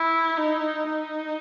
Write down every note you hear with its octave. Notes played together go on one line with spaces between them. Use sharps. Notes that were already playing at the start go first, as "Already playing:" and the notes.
Already playing: E4
D#4
D#4